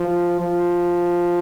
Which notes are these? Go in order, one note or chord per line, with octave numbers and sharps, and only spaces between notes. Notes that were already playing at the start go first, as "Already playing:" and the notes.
Already playing: F3
F3